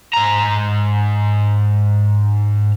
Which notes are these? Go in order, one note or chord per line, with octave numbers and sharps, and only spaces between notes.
G#2 A#5